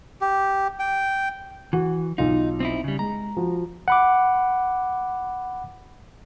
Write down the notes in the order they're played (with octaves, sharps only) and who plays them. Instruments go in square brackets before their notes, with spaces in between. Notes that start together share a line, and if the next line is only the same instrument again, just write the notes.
[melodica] G4
G5
[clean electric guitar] E3 [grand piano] F#4
[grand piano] B1 F4 [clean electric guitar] D#4
[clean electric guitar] C4 D#4 E4
C#3 G3
[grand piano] G#3 [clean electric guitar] A#5
[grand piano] F3 F#4
[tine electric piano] F#5 B5 D6